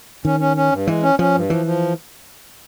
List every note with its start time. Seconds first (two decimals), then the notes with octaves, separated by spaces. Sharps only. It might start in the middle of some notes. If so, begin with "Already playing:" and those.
0.25 D#3 C#4
0.40 C#4
0.57 C#4
0.72 G2
0.87 E3 G#3
1.03 C#4
1.19 F3 C#4
1.35 G2
1.50 E3 F3
1.66 F3